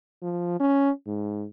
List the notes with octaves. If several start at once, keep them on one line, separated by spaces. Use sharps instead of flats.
F3
C#4
G#2